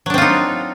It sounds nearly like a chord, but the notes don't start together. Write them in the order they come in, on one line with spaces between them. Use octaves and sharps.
F#3 D4 C4 F4 D#4